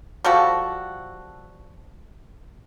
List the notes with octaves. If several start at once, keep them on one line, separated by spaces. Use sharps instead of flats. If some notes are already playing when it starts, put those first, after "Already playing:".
F3 G3 F#4 A4